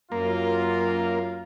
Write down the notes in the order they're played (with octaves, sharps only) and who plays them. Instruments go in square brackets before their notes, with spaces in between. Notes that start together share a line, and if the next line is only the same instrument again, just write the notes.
[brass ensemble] F#2 F4 [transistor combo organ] A#3